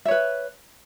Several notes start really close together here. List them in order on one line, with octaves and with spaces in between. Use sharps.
E5 C#5 B4